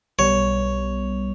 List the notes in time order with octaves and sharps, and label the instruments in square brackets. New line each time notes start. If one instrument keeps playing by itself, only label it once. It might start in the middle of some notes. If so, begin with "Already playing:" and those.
[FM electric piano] B1 B2 G3 B3 [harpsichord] C#5